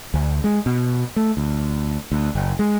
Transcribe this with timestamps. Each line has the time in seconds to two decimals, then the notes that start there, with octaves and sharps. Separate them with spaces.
0.14 D2
0.44 G#3
0.66 B2
1.16 A3
1.37 D2
2.12 D2
2.35 F#1
2.59 G#3